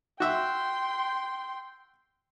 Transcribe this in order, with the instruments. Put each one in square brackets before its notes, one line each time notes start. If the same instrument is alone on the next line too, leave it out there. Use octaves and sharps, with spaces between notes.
[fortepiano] F#4 E5 [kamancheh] G5 C6